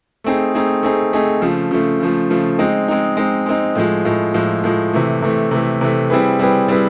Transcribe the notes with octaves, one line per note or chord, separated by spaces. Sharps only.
A3 C4 D#4 G#4
A3 C4 D#4 G#4
A3 C4 D#4 G#4
A3 C4 D#4 G#4
C#3 F3 A3
C#3 F3 A3
C#3 F3 A3
C#3 F3 A3
G#3 C4 D#4
G#3 C4 D#4
G#3 C4 D#4
G#3 C4 D#4
A2 F3 G#3
A2 F3 G#3
A2 F3 G#3
A2 F3 G#3
C3 E3 A3
C3 E3 A3
C3 E3 A3
C3 E3 A3
G3 C4 E4 G#4 B4
G3 C4 E4 G#4 B4
G3 C4 E4 G#4 B4